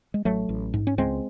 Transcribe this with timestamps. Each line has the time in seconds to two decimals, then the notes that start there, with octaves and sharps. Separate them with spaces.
0.14 G#3
0.25 A1 F#3 A3
0.49 A1
0.74 G#2
0.87 C#4
0.98 C#2 G#3 C4